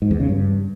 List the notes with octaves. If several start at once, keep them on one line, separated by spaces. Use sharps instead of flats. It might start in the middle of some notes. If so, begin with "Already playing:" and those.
G#2
E2
C#3
G2